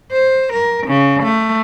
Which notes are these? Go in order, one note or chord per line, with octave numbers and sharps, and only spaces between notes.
C5
A#4
C#3
A3